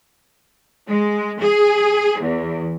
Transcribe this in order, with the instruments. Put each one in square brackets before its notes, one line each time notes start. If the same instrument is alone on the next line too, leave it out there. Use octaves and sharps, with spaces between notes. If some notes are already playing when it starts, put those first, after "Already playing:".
[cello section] G#3
G#4
E2